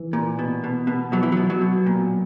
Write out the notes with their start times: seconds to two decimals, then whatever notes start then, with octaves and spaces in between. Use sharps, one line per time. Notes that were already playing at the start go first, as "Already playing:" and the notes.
Already playing: E3
0.13 A#2
0.39 B2
0.64 B2
0.87 B2
1.12 B2 F#3
1.23 E3
1.32 B2 F#3
1.50 F#3
1.62 B2
1.86 A#2